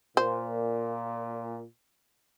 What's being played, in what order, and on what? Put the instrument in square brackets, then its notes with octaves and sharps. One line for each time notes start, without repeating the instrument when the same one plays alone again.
[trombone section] A#2 [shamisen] C5